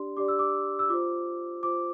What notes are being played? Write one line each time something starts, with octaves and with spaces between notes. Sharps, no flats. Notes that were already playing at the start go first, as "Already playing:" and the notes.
Already playing: D4 G4 D5 C6
D4 G4 D5 D6
E6
D6
E6
F4 C5 D6
F4 C5 D6